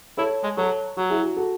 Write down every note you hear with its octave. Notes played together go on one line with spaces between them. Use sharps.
E4 A4 C#5
G#3
F#3 A4 C#5
F#3 F#4
E4 G#4
F#4
F#4 A4